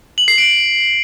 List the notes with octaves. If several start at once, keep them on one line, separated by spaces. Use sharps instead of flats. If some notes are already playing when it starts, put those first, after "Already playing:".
F#7
C7
D7